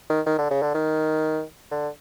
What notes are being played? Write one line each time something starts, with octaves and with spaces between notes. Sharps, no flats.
D#3
D#3
D3
C#3
D3
D#3
D3